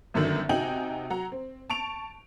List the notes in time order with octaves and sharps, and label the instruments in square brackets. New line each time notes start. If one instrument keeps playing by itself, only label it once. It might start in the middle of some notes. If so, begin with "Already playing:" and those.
[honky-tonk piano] G1 F#2 D3 D#3
C3 D#4 F#4 G5 G#5 F#7
F#3 F#5 A#5
C4
A5 C#6 D7 F7